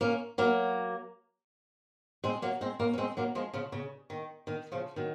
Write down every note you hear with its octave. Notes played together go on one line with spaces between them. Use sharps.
A#3 C#4
F#3 A#3
G#3 C4
F#3 A#3
G#3 C4
A#3 C#4
C#4
G#3 C4
F#3 A#3
F3 G#3
C#3 F3
C#3
D#3
D#3
C#3 F3
D#3 F#3